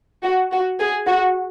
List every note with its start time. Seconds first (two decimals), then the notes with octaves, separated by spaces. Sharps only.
0.23 F#4
0.52 F#4
0.80 G#4
1.08 F#4